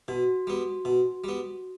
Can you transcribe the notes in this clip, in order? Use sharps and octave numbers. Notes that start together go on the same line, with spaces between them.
B2 F#4
G3 B3
B2
G3 B3